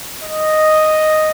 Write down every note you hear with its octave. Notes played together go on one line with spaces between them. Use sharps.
D#5